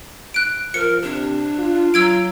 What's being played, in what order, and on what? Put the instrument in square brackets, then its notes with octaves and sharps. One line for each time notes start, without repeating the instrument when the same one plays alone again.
[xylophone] F#6 D7
[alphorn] F3 [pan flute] A#4 [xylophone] C#7
[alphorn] C3 [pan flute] D4
[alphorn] F4
[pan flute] F#3 [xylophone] E6 G#6 D7